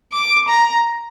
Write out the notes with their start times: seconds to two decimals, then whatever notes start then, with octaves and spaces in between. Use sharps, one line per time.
0.12 D6
0.48 A#5